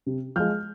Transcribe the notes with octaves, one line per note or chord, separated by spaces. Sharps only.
C3
F3 G#3 F6 G6